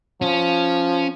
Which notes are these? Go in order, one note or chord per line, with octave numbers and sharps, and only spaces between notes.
F3 C#4